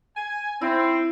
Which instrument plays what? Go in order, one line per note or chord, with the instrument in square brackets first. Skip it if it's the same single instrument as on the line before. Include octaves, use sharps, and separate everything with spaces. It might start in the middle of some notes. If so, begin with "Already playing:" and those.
[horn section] G#5
[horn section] C4 [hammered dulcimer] E4